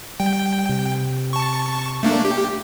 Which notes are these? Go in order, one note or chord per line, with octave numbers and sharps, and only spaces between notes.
G3 G5
C3
A5 C#6
A3 A#3 D4
G4